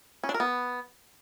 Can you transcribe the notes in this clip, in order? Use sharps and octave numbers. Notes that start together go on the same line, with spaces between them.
C#4
D4
A#4
B3